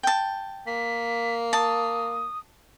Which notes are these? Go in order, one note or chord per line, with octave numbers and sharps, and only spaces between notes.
G5 A5
A#3 B6
A5 D#6